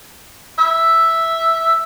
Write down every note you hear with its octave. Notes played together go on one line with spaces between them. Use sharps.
E5